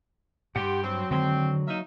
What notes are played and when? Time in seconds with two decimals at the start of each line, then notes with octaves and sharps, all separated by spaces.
0.56 G2 G4 F#5 G5 C6
0.84 F#3 C4
1.11 D3 D#3 G#3 C4
1.68 A#3 D#4 E5